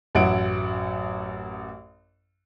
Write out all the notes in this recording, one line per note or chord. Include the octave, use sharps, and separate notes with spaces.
A1 F#2 F#3 E4 F#5 D7